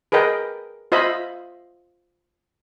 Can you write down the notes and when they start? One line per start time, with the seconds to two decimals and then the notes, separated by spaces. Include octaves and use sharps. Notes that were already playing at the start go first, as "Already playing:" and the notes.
0.12 G#4 A#4 B4 D#5 G5
0.92 F4 C5 D#5 E5 B5